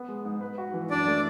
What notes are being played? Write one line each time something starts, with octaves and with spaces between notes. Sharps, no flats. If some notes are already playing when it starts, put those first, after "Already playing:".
Already playing: B3
G#3
G#2
B4
F#4
E3
F#2 D4 D5
A3